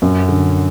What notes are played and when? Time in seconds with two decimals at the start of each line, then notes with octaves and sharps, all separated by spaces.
0.02 F#2
0.28 D3